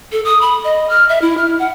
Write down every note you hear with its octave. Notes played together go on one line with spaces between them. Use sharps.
A4
D#6
B5
D#5
F6
E5
E4
F6
F#5